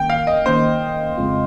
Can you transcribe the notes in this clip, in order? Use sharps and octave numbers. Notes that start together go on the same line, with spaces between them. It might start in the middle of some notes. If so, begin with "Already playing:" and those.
Already playing: D#3 A#3 C#4 G5
F5
D#5
D#3 A#3 C#4 C5
F2 C#3 G#3 C4 F4